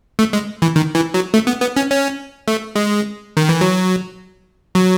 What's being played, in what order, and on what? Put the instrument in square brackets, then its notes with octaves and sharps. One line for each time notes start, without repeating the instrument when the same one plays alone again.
[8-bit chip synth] A3
G#3
E3
D#3
E3
F#3
A3
B3
B3
C#4
C#4
A3
G#3
D#3
E3
F#3
F#3